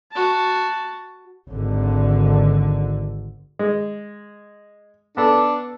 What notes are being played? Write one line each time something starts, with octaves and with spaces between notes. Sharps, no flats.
F#4 A5
G#1 D3
G#3
B3 D4 A4